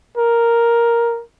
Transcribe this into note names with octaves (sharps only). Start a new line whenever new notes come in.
A#4